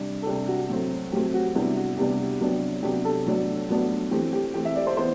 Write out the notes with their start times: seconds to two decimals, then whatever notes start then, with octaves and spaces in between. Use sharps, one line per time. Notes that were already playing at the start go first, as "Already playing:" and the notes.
Already playing: C3 G3 D4
0.22 A4
0.26 C3 G3 D4 G4
0.48 F#4
0.69 A2 F#3 A3 C4
1.12 A2 F#3 A3 C4 G4
1.34 F#4
1.55 C3 G3 B3 D4 E4
1.76 F#4
1.97 C3 G3 B3 D4 G4
2.41 C3 F#3 B3 D4
2.83 C3 F#3 B3 D4 G4
3.05 A4
3.26 A2 F#3 B3 D4
3.69 A2 F#3 B3 D4
4.11 E3 A3 C4 G4
4.33 G4
4.54 E3 A3 C4 G4
4.65 E5
4.76 D5
4.87 C5
4.97 E3 B3 C5